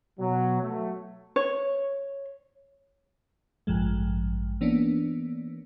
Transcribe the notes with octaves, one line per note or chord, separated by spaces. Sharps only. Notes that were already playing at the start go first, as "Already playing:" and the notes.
B2 F#3
F#3 A3
C#5
A1 G2 F3 G#3
E3 A#3 B3 C#4 D4